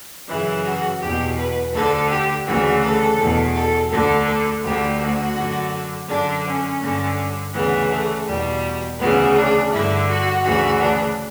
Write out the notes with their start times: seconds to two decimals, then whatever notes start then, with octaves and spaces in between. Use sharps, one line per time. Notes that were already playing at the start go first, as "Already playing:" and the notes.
0.27 F#2 C#3 E3 E4
0.63 F#4
0.99 E2 B2 G4
1.36 B4
1.72 D2 D3 A4
2.08 G4
2.45 D2 C#3 E3 F#4
2.81 A4
3.17 E2 B2
3.54 A4
3.90 D2 D3 A4
4.26 A4
4.63 D2 D3 G4
4.99 F#4
5.35 F#2 D3
6.08 F#2 D3 D4
6.44 C#4
6.80 G2 D3
7.53 D2 C#3 E3 B3
7.89 A3
8.26 E2 B2 G3
8.98 D2 C#3 E3 B3
9.35 D4
9.71 G2 D3 E4
10.07 F#4
10.43 D2 C#3 E3 F#4
10.80 D4